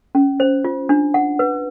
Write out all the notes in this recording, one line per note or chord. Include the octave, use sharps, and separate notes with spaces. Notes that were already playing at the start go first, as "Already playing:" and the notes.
C#4
C5
F4
D4
F#5
B4